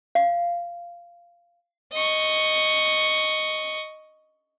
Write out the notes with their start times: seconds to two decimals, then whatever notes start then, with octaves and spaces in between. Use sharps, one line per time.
0.15 F5
1.93 D#5 C#6